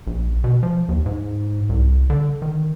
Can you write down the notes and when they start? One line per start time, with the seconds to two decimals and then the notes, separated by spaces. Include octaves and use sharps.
0.07 A#1
0.44 B2
0.63 F3
0.89 D#2
1.06 G#2
1.69 C2
2.10 D3
2.42 D#3